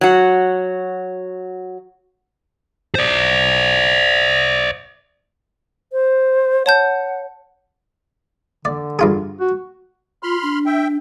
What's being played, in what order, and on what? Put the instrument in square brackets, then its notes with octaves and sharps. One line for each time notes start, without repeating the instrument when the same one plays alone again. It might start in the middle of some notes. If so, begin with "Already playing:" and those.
[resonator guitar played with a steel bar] F#3 F#4
[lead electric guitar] C5 D5
[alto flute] C5
[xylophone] C#5 A5 G6 [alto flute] F#5
[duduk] D3 [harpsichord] D5
[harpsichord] G2 F4 G#4
[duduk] F#4
[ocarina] F4 [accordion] B5 C6 F6
[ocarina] D4
[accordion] E5 G5